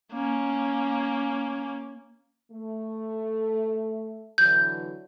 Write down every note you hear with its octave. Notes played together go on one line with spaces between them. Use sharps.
A#3 C#4
A3
D3 E3 F#3 G6